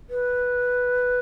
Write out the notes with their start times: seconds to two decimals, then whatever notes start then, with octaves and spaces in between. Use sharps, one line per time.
0.10 B4